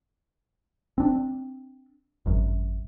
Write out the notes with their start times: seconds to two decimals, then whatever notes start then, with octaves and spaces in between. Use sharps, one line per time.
0.98 C4 D4
2.26 G#1 F#2